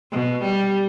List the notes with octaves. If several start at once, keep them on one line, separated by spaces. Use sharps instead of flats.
B2
G3